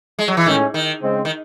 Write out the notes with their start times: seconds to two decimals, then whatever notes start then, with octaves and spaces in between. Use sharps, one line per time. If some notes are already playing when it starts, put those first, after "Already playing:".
0.19 G#3
0.28 F#3
0.37 E3
0.46 A2 D#3 G#3 C#4
0.74 D#3
1.02 C#3 G#3 C4
1.25 D#3